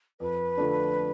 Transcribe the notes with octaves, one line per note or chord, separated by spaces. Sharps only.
F2 B4
D3 F3 A3 D4